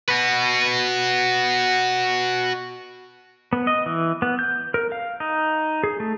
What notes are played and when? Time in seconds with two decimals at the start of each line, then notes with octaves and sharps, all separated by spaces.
0.08 F#4 B4
3.53 B3
3.67 D#5
3.86 E3
4.22 B3
4.39 G6
4.74 A#4
4.92 F5
5.20 D#4
5.84 G#4
6.00 A3